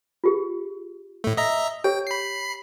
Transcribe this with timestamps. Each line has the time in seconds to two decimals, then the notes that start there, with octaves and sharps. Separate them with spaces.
0.24 F4 G4 G#4
1.24 A2 A3
1.37 D#5 E5 A#5
1.84 G4 C#5 G5
2.07 B5 C7